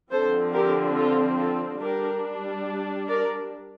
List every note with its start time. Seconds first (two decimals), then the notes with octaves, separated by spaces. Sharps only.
0.11 D3 F3 C4 A4 C5
0.53 G4 A#4
0.96 F4 A4
1.38 F4 A4
1.81 G3 D4 G4 A#4
3.08 A#4 D5